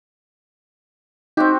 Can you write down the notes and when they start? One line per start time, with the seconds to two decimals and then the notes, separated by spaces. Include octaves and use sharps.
1.37 C4 D#4 F#4 G4